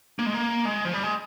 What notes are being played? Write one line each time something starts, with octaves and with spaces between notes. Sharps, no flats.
A#3
G#3
A#3
G#3
F3
G3
G#3